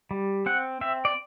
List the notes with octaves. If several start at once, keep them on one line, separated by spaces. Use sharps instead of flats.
G3
C4 F#5
C4 E5
D5